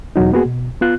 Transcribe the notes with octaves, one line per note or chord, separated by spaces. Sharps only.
E2 B2 F#3 D#4
A#3 B3 F#4 G#4
B2
B3 F4 F#6